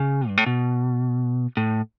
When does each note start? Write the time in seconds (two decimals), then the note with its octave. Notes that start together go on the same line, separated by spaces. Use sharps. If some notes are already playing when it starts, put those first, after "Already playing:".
Already playing: C#3
0.28 G2
0.37 A2
0.46 B2
1.57 A2